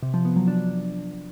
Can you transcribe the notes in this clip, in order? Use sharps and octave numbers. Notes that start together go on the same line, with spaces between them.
C3
F3
B3
F#3
D4